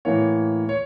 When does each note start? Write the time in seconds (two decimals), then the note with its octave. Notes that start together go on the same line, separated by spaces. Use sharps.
0.05 A2 E3 A#3 C#5
0.69 C#5